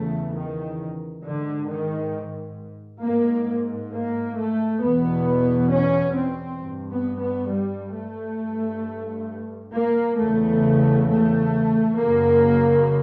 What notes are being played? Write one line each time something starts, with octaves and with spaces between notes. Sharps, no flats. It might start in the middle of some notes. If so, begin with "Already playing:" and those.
Already playing: E2 C#3 A3
D#3
G#2 D3
D#3
G#2 A#3
A#3
A3
E2 B2 B3
C#4
C4
G2
B3
B3
G3
A3
G2
A#3
E2 C#3 A3
A3
F#2 C#3 A#3